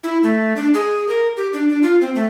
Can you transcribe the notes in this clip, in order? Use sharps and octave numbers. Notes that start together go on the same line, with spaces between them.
E4
A3
D4
G#4
A#4
G4
D4
D4
F4
C4
A3